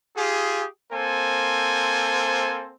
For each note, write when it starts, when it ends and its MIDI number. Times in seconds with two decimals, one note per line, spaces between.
0.17 0.66 65
0.17 0.66 67
0.17 0.66 68
0.92 2.72 58
0.92 2.72 60
0.92 2.72 69
0.92 2.72 72
0.92 2.72 80